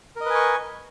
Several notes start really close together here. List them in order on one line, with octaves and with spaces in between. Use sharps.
A#4 D#5 B4 G#5 C#6